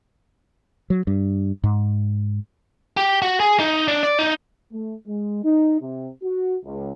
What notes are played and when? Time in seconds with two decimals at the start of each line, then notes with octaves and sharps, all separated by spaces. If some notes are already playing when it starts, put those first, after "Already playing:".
0.90 F#3
1.07 G2
1.64 G#2
2.97 G4
3.22 F#4
3.40 G#4
3.59 D#4
3.88 D4
4.03 D5
4.19 D#4
4.71 A3
5.07 G#3
5.43 D#4
5.80 C3
6.22 F#4
6.64 C#2